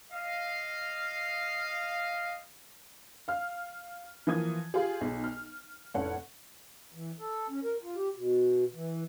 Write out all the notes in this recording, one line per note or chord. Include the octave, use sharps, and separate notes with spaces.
D#5 F5
F5 F6
E3 F3 A#3 D#6 G#6
F4 G4 G#4
B1
F6
F1 A2 C#4 A4 F#5
E3
A4
C#4
A#4
F4
G4
B2
E3